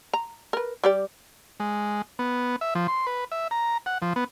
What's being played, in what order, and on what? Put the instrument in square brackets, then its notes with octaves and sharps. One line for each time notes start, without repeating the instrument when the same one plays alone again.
[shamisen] A#5
A#4 B4
G3 G4 D5
[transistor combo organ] G#3
B3
E5
F3
C6
B4
E5
A#5
F#5
F3
B3